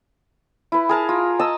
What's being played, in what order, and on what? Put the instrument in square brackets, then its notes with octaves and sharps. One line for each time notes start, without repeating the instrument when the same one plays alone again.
[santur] E4 B4
G#4 A#4 A5
F4
D#5 A5 A#5 E6